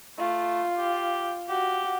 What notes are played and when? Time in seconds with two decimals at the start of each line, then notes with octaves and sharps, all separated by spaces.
0.18 A3 F4
0.78 G4
1.49 F#4 G4